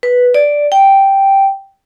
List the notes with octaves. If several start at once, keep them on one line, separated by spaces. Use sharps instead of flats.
B4
D5
G5